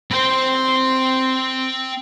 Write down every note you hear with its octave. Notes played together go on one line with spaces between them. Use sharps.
C4 C5 C6